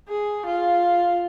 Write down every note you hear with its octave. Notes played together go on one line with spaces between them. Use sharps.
G#4
F4